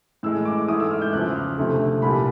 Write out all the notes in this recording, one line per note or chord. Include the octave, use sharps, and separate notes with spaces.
A2 E3 G#3 E6
D6
G#2 E3 A3 D#6
E6
F6
G6
E2 C#3 F3 F#6
F6
D2 C3 F3 A3
C2 A#2 G3 B5